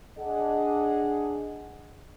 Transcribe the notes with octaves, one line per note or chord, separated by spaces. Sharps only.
D4 G#4 D#5 F#5